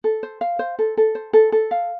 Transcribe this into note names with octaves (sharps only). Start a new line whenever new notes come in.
A4
C5
F5
C5
A4
A4
C5
A4
A4
F5